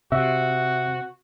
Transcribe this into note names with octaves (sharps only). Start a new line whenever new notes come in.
C3 F#4 E5